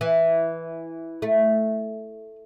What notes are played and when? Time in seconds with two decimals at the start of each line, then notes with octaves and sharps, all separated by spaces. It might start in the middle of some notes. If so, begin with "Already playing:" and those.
0.01 E3
1.22 A3